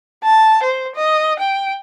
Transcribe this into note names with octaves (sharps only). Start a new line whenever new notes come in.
A5
C5
D#5
G5